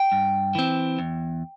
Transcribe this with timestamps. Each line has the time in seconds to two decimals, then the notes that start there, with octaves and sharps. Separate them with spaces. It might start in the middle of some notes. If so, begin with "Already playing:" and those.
Already playing: G5
0.12 G2
0.55 E3 C4
0.99 E2